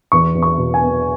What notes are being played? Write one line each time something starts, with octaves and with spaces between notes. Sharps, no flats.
E2 C#6
E2
C#6
B2
G#5
B3